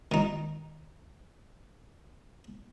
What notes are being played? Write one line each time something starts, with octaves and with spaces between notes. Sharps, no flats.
D#3 D#4